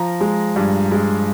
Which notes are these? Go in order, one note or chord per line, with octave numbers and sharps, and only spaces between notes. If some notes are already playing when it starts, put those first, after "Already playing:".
Already playing: F3 A#5
G#3
G2
G#3